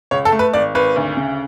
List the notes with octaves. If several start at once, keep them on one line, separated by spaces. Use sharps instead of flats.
C#2 C#5
A4
A3
B4
G#1 D5
G#1 B4
D2
C#3